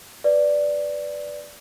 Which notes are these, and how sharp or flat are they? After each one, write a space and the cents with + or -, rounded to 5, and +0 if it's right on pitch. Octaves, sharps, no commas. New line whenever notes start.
B4 +0 D5 +0